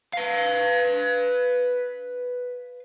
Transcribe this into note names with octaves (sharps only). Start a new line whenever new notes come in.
B4 F5